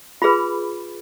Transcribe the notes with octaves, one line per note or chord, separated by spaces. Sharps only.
F4 G#4 B4 B5